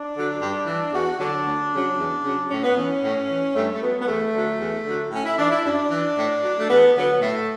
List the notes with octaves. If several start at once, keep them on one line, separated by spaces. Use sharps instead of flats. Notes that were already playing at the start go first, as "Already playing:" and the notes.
Already playing: D4
D3 F#3
G2
E3
E2 F#4
D3 F#3 D4
D2
C#3 F#3
E2
C#3 F#3
A2 C#4
B3
E3 C#4
A2
E3
G2 A3
A3
F#3 B3
B3
E2 A3
D3 F#3
E2
D3 F#3
A2 C#4
E4
E3 D4
E4
F#2 D4
E3
A2
F#3
A3
E2 B3
D3 F#3 B3
A2 A3